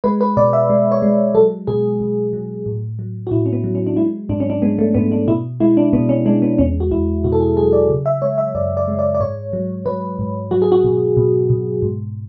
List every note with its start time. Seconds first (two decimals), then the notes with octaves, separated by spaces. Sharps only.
0.04 G#3 B4
0.21 B4
0.37 B2 D5
0.53 E5
0.70 G#3
0.92 C#5
1.02 G#3
1.35 F#3 A4
1.67 B2 G#4
2.00 B2
2.33 F#3
2.66 A2
2.99 F#3
3.27 F#4
3.31 A2 E4
3.46 C#4
3.53 B3
3.64 F#3
3.75 C#4
3.87 D4
3.96 G#3 E4
4.29 G#2 D4
4.40 C#4
4.50 D4
4.62 G#3 B3
4.79 A3
4.94 G#2 B3
5.12 D4
5.27 B2 E4
5.60 G#3 E4
5.77 D4
5.93 B2 B3
6.09 C#4
6.25 G#3 D4
6.42 B3
6.58 E2 C#4
6.80 F#4
6.91 E2 E4
7.24 B2 F#4
7.32 A4
7.40 G#4
7.56 F#3 G#4
7.73 D5
7.90 C#3
8.06 E5
8.22 G#3 C#5
8.38 E5
8.55 F#2 D5
8.77 D5
8.88 G#3
8.99 D5
9.15 D5
9.20 G#2 C#5
9.53 F#3
9.86 F#3 B4
10.19 G#2
10.51 F#3 F#4
10.62 G#4
10.72 F#4
10.84 B2
11.17 B2
11.50 B2
11.82 G#2